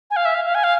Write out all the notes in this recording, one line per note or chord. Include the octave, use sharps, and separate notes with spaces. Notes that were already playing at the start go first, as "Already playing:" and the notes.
G#5
F5
E5
F5
F5
G#5
F5